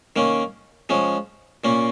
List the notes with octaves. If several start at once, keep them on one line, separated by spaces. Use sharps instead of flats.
D#3 A#3 C#4
F3 G#3 C#4
A#2 A#3 C#4